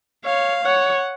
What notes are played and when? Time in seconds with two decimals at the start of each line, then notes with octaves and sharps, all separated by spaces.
0.24 C#5 F5
0.64 C#5 F#5